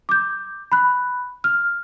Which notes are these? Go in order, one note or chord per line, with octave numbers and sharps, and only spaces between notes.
D6 G6
B5 F#6
F6